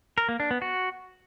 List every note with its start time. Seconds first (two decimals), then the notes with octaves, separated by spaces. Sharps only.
0.18 A#4
0.29 A#3
0.40 D4
0.51 B3
0.62 F#4